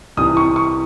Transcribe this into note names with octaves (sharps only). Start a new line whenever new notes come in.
C2 C3 E3 D#6
C#6
C#6